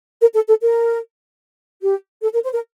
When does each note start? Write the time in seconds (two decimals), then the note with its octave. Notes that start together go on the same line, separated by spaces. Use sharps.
0.21 A#4
0.35 A4
0.48 A4
0.61 A#4
1.82 G4
2.23 A4
2.33 A#4
2.44 C5
2.53 A#4